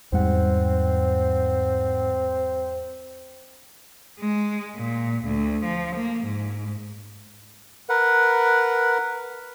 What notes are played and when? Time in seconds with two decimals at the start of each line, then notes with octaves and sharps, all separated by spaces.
0.13 E2 G#2 G3 C4 F#5
4.20 G#3
4.77 A#2
5.24 D2
5.65 F3
5.96 A#3
6.25 G#2
7.89 A#4 B4 F#5